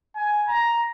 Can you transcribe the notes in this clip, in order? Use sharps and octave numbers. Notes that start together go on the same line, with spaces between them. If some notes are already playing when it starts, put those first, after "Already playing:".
G#5
A#5